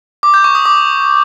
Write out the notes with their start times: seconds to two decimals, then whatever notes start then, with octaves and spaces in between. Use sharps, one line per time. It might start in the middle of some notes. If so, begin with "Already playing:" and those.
0.23 D6
0.34 G6
0.44 C#6
0.55 D#6
0.66 D6